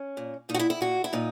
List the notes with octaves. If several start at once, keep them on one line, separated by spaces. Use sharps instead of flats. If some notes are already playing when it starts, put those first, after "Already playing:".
Already playing: C#4
A#2
A#2 D#4
F#4
E4
E4
A#2 F#4
E4
A#2 D#4